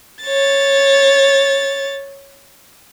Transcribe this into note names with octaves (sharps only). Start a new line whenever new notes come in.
C#5 A6